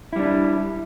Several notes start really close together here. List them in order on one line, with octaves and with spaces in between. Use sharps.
E4 G3 D4